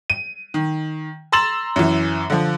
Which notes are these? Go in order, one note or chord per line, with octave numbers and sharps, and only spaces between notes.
D#7
D#3
A#5 C6 E6 A6 E7 F#7
F#2 E3
D3 F3